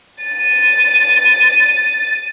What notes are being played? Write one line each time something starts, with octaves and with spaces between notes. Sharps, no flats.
A6 D#7